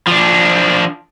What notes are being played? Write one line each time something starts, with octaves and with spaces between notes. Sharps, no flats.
F3 D4